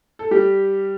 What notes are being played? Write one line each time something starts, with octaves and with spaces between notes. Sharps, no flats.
A4
G3 G4